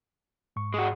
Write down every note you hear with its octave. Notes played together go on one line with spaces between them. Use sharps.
G#2 C#6
G#3 F#4